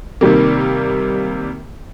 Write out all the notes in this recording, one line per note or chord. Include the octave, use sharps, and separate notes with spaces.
C3 D#3 G3 A#3